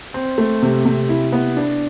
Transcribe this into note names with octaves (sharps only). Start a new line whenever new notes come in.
C4
A3
C3
C3
E4
B3
D4